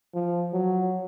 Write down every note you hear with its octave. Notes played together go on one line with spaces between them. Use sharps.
F3
F#3